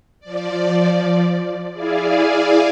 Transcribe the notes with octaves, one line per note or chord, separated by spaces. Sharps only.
F3 D5
E4 G#4 D5 F5 G#5